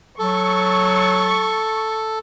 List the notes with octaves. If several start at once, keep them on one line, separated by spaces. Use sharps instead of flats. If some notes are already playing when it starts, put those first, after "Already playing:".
F#3 A4 C#6 A6